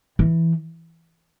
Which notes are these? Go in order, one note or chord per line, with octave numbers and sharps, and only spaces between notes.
E3